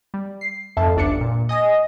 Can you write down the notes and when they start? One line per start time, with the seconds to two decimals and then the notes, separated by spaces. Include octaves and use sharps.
0.14 G3
0.41 C7
0.77 F2 G#2 A4 E5 A5
0.96 G1 C#2 D4 D6 C#7
1.21 A#2
1.49 D#5 G#5 D#6 A#6